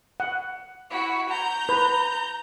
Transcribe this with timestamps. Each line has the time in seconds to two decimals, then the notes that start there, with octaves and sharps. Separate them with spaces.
0.20 F#5
0.90 E4 F#4
1.29 A#5 G6
1.69 B4